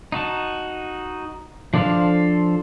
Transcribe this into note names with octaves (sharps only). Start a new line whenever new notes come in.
D#4 F#4 A5
F3 D4 A4 C5 F5